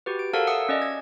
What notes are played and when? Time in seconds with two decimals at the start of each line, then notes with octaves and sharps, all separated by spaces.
0.06 F#4 G4 B4
0.19 D7
0.34 A4 A#4 C#5 F5 F#5 A5
0.47 E5 F#5 D#6 E6
0.69 C#4 D5 D#5
0.82 G#6